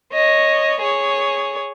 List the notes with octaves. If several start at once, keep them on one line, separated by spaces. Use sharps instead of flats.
C#5 D#5
G#4 C#5